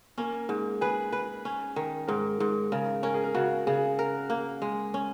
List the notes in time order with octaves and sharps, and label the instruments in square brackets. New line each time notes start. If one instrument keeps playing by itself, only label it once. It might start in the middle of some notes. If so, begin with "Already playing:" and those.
[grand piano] A#3 [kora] C#4
[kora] G#2
[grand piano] G#4 [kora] B4
[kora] B4
C#4
D#3
[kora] G#2 [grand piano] A#4
[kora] G#2
[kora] C#3 [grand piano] A#4
[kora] C#4 [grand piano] A#4
[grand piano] G#4
A#4
[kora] C#3 [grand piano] F#4
[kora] C#3 [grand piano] G#4
[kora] A#4
A#3
G#3
C#4